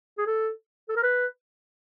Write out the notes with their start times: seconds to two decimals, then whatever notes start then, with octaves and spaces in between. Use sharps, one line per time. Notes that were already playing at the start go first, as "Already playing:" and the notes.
0.18 G#4
0.26 A4
0.89 A4
0.96 A#4
1.03 B4